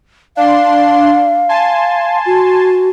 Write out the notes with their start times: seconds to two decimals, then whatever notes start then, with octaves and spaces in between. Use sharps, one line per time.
0.37 D4 F5 C6
1.49 G#5 A5 C6
2.26 F#4